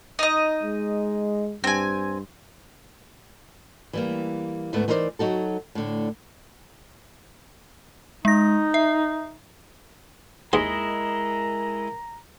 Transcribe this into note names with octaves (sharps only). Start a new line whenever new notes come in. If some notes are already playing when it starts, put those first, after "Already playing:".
D#4 D#5
G#3
G2 C4 G#5
E3 G3 A#3
D2 G#2 A3 B3 B4
E3 D#4 A#4 C5 D5
F#3 D#4 F#4 A4
A2 D3
G#3 D#4 A#6
E5
D#2 G#3 E4 G#4 A#4 D#5 A#5 C6